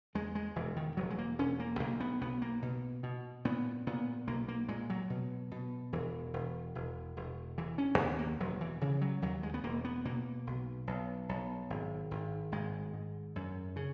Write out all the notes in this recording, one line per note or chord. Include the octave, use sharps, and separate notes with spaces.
E2 G#3
G#3
E1 E3
D#3
E1 F#3
G#3
A#3
E1 C#4
A#3
B1 A#3
B3
B1 B3
A#3
B2
B2
A#2 B3
A#2 B3
B1 A#3
A#3
A#2 G#3
F#3
B2
B2
E1 E3
E1
E1
E1
E1 E3
C#4
D#2 B3
A#3
E1 F#3
E3
C#3 E3
F#3
D#2 F#3
G#3
B3
E1 A#3
B3
B2 A#3
B1
B1
B1
G#1
G#1
G#1 G#3
G#2
F#2
C#3